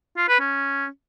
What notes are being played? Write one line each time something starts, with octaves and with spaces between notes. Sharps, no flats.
F4
B4
C#4